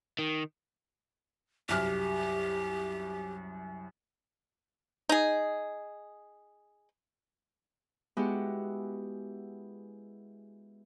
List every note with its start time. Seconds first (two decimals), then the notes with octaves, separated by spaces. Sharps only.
0.19 D#3
1.69 C2 F#2 G4 F6
5.09 D#4 G#4
8.17 G#3 B3 E4 F#4 G4